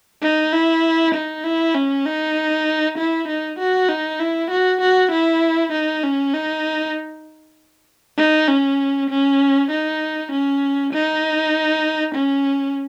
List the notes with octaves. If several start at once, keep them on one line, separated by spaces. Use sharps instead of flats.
D#4
E4
D#4
E4
C#4
D#4
E4
D#4
F#4
D#4
E4
F#4
F#4
E4
D#4
C#4
D#4
D#4
C#4
C#4
D#4
C#4
D#4
C#4